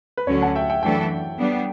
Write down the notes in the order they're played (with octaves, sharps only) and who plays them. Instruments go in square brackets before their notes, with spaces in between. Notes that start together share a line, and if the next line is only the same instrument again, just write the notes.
[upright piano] B4
[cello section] D2 D3 F#3 C#4 [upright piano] A4 C#5
[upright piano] F#5 A5
E5 G5
E5 G5
[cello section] F#2 E3 A3 D4 A4 [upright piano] E5 G5
[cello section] G3 B3 D4